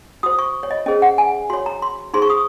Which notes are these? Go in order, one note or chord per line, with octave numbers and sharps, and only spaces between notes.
F#4 C5 D#6
C#6
C#5
D#5
C#4 G#4 C5 D#5
F#5
G#5
F#4 C#5 C6
A#5
C6
D#4 G#4 C5 C6
C#6
D#6